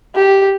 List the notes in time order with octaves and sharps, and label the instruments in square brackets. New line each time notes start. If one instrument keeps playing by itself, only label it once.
[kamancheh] G4